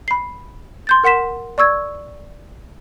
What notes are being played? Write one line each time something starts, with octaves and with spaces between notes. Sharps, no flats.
B5 C7
C6 G6 A6
A#4 F#5 C6 B6 E7
D5 C#6 E6 G#6